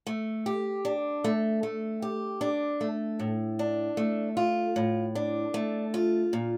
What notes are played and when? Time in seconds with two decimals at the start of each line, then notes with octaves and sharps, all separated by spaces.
0.07 A3
0.46 G4
0.85 D4
1.24 A3
1.63 A3
2.02 G4
2.41 D4
2.81 A3
3.19 A2
3.59 D4
3.97 A3
4.37 F4
4.76 A2
5.15 D4
5.54 A3
5.94 F4
6.33 A#2